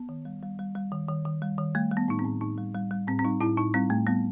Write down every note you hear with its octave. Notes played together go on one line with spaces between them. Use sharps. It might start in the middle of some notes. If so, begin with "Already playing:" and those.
Already playing: B3
D#3
G3
G3
G3
G3
D#3
D#3
D#3
G3
D#3
G3 A3
G3
B3
A2 D#4
C4
A2
A2 D#4
G3
G3
G3
A2 C4
C4
G3 D#4
A2 E4
A2 D#4
G3 C4
A2 A3
G3 B3